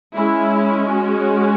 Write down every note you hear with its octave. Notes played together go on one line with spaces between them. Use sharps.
G#3 C#4 E4
F#4